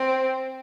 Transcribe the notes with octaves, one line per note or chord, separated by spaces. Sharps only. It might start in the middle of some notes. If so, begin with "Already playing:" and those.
Already playing: C4